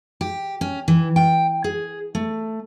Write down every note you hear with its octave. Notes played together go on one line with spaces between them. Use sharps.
G4
C#4
E3
G5
G#4
A3